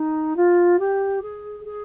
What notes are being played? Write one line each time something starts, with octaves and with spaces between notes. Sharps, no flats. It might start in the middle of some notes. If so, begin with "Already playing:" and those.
Already playing: D#4
F4
G4
G#4
G#4